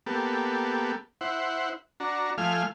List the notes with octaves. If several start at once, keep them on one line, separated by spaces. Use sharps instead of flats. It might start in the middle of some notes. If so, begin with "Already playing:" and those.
A#3 B3 G4 A4
E4 C5 F#5
D4 F#4 A#5
F3 A3 F5 G#5 F6